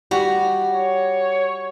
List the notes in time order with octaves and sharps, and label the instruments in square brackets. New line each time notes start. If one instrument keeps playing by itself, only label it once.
[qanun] G3 [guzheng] F#4
[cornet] C#5